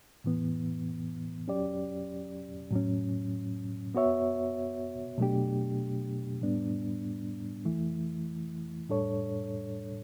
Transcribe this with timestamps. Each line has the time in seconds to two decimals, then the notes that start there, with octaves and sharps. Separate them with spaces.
0.24 A2 E3 B3
1.48 F#3 C#4 G4 D5
2.71 A2 F#3 C#4
3.95 B3 F#4 C#5 E5
5.18 B2 F#3 A3 D4 G4
6.42 A2 G3 B3 D4
7.65 E3 A3 E4
8.89 A2 G3 D4 A4 C#5